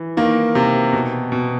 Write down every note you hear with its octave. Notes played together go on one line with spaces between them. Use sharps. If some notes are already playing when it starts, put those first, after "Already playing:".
Already playing: E3
D#3 A#3
C3
B2
B2